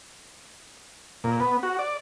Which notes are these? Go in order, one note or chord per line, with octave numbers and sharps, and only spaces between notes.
A#2
B3
F#4
D5